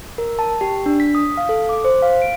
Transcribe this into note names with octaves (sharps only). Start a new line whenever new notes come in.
A#4
A5
G4
D4
B6
D#6
F5
A4
D6
C5
F5
D7